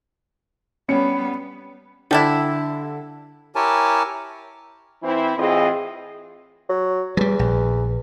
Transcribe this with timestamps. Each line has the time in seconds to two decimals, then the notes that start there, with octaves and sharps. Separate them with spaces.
0.89 G3 B3 C#4 C#7
2.11 D3 G3 D4 E4
3.55 E4 G4 A#4 C#5 G#5 A5
5.03 E3 C4 E4
5.38 A2 E3 C4 F4 G#4 D#5
6.69 F#3
7.17 E2 F#3 G3
7.39 A#1